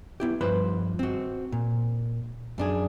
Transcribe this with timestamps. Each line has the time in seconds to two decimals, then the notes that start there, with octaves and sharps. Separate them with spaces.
0.20 B3 E4 G4
0.41 G2 F3 B4 C5 B5
0.99 C4 F#4
1.52 A#2
2.58 F#2 D4 G#4